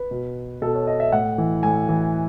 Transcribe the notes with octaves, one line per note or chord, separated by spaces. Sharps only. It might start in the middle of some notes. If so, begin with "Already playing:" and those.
Already playing: B4
B2
B2 A4
C#5
D#5
E5
A2 F#5
E3
A2 G#5
E3